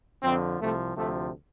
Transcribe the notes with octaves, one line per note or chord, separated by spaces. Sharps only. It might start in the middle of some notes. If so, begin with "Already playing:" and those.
F2 D3 F3 C4
C2 C3 F3 A3
D2 C3 F3 A3